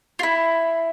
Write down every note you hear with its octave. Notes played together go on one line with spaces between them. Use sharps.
F4
E4